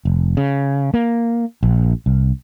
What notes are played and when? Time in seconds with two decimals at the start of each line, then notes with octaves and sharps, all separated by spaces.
0.05 F1
0.37 C#3
0.94 A#3
1.63 A#1
2.06 C2